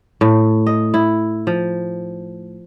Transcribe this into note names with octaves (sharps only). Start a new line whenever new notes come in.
A2
D#5
E4
F3